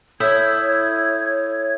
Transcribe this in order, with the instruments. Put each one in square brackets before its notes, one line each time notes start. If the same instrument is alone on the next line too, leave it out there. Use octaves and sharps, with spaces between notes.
[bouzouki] E4 E5 [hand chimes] A4 D#6 G6 [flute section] C#5 G#6